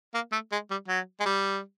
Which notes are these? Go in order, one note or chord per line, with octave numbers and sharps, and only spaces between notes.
A#3
A3
G#3
G3
F#3
G#3
G3